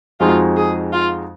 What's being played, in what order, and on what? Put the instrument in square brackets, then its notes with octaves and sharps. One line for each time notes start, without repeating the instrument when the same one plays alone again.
[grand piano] F2 F3 G#3 D#4 F#4 [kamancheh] F4
[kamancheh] G#4
F4